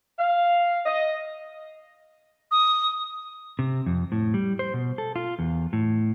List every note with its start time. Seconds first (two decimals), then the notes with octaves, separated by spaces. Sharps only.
0.18 F5
0.86 D#5
2.51 D#6
3.59 C3
3.86 F2
4.12 A2
4.34 G3
4.59 C5
4.74 B2
4.98 A4
5.16 F4
5.39 E2
5.73 A2